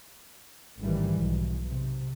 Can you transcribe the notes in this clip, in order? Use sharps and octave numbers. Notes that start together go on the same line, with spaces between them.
A1 G#2 D#3 E3 G3
B1
C3